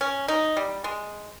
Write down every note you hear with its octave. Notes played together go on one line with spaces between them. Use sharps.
C#4
D#4
G3
G#3